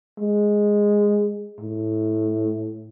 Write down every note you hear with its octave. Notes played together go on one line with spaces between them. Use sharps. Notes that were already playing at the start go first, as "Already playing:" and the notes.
G#3
A2